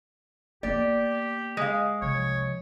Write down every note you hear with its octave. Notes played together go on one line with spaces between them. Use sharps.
A#3 B3 G4 D5
G#3 F5
C2 F3 C#5